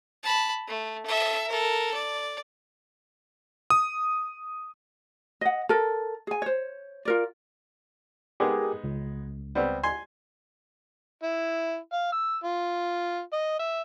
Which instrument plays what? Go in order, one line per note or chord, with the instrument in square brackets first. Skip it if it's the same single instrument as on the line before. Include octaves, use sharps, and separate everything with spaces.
[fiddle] A5 B5
A3
A4 E5
A4 A#4
D5
[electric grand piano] D#6
[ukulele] D#5 F#5
A4 A#4
G#4 G#5
C5 C#5
F4 A#4 D5
[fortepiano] G#3 B3 D#4 [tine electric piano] G4 G#4 A#4
[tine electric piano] C#2
[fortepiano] G3 B3 C4
G#5 C6
[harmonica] E4
F5
E6
F4
D#5
E5